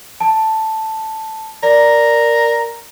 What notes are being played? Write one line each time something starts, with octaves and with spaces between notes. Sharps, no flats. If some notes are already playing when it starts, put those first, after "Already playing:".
A5
A#4 D5